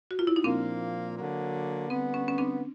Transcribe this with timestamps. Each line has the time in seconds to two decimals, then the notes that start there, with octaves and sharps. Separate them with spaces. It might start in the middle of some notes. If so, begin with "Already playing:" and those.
0.11 F#4
0.19 F4
0.27 E4
0.36 D#4
0.44 A#2 F3 A#3 C4 D4
1.17 D3 F#3 A#3
1.89 D3 G3 B3 C4
2.14 C#4
2.28 C#4
2.38 C4 D4